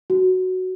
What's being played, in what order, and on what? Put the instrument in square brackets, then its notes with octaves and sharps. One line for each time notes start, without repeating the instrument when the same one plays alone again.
[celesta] F#4